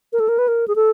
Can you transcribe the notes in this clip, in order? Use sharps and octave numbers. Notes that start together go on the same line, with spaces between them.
A#4
A4
A#4
B4
A#4
G#4
A4